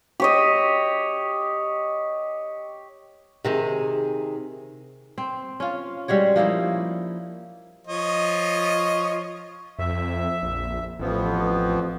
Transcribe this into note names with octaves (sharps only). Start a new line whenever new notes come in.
G4 C#5 D#5
C3 D#3 G#4
C4
C#4 F4
G3 G#3 F#4 C#5
F3 A#3 D#4 E4
F3 C#5 D#5
F2 E5
A#1
A1 F2 F3 B3